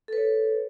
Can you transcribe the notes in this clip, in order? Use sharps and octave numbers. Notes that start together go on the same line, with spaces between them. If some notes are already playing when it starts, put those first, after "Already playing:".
A4 B4 C#5